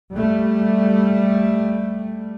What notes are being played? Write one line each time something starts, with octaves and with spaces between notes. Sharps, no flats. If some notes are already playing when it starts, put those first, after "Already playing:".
G3 A3